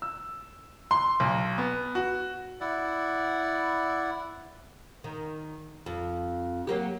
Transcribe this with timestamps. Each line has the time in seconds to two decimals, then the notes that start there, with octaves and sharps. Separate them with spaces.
0.02 E6
0.91 C6
1.20 B1
1.58 B3
1.95 F#4
2.61 E4 D5 F#5
5.04 D#3
5.86 F2
6.67 F#3 A#3 G4